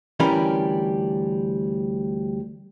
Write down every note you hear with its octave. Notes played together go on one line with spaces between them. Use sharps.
D2 E3 G3 C#4 A#4 B5